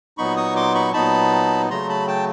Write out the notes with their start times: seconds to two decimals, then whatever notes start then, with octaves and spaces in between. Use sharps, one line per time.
0.18 A#2 F#3 B3 D#4 B5 C#6
0.37 C#6 D#6
0.56 C6 D6
0.75 B5 C#6
0.93 A#2 F#3 B3 D#4 A5 B5
1.70 C#3 F#3 A3 A#5 C6
1.89 A5 B5
2.07 G5 A5